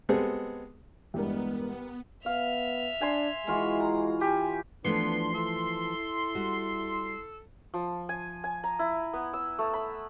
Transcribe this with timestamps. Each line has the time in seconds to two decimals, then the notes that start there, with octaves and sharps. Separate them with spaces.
0.09 G3 G#3 B3 C4 G#4 A4
1.14 E2 G2 G3 G#3 B3 G4 A#4
2.26 B3 E5 F5 F7
3.01 D4 G#5 C6
3.47 E3 G#3 F4 F#4
3.80 A#5
4.21 G4 G#5
4.84 E3 F3 A3 B3 D4 C6
5.34 E4 A4
6.35 G3 F#4
7.74 F3
8.09 G#5
8.44 G#5
8.64 A#5
8.79 E4
9.13 B3
9.33 E6
9.59 A3
9.74 B5